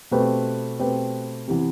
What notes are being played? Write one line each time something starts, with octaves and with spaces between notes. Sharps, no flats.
B2 A3 C4 G4 B4
B2 A3 C4 G4 B4
C3 E3 B3